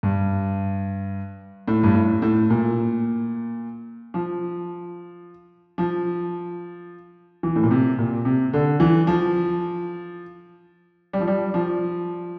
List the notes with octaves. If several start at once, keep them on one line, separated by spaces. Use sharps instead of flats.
G2
A2
G2
A2
A2
A#2
F3
F3
E3
A2
A#2
C3
A#2
C3
D3
E3
F3
G3
F3
G3
F3